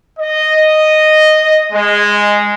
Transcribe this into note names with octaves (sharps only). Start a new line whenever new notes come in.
D#5
G#3